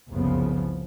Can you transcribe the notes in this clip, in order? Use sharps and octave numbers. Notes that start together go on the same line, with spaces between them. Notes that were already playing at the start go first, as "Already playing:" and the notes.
F#1 C2 F2 C#3 F3 B3